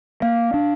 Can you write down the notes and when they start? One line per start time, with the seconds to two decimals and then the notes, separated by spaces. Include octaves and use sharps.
0.22 A#3 F5
0.54 D4